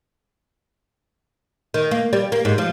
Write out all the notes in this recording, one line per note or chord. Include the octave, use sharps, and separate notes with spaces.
D#3
A#3
G3
A#3
G#2
F3